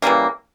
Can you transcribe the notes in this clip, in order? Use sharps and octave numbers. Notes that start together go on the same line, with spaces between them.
C#3 E3 G3 A#3